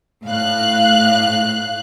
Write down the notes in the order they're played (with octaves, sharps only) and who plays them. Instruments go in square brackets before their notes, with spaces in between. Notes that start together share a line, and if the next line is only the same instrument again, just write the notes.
[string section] A2 F5 F#6